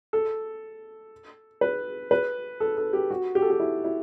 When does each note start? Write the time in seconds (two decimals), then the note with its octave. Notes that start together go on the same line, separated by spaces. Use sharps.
0.13 A4
1.61 B4
2.11 B4
2.60 A4
2.77 A4
2.93 G4
3.10 F#4
3.35 G4
3.42 A4
3.50 G4
3.60 E4
3.84 E4